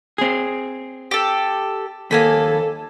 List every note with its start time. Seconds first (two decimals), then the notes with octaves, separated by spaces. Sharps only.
0.18 C4 G#4
1.11 G4 A4
2.11 D#2 A#3 A4 G#5 B5